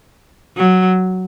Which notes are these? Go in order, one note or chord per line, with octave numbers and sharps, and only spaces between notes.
F#3